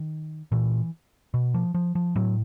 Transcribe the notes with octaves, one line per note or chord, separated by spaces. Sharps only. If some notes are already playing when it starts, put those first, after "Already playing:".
Already playing: D#3
A#2 E3
B2
F3
F3
F3
A2 F#3